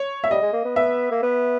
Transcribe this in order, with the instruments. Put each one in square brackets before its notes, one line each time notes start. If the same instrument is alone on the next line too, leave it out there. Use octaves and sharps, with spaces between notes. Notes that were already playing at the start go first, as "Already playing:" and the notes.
Already playing: [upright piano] C#5
E5
[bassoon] G3 [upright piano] D#5
[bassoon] G#3
A#3
B3
[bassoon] B3 [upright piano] E5
[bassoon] A#3
B3